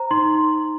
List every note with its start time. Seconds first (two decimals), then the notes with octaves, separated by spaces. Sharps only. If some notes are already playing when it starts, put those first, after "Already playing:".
Already playing: C5 A#5
0.11 D#4 C6